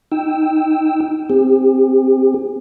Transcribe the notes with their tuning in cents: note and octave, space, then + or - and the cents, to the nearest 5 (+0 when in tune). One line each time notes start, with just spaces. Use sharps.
D#4 +0 G5 +0 E6 +0
C4 +0 G4 +45